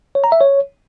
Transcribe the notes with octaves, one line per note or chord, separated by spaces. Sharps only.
C#5
A#5
E5
C#5